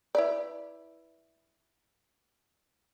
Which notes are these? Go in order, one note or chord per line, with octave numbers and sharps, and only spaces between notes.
E4 B4 D5